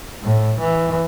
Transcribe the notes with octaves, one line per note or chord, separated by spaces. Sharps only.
A2
E3